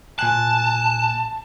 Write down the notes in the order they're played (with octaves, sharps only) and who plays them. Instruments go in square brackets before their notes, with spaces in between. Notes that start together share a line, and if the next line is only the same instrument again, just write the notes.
[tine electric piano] A#2 G#5 F#6 [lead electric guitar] A5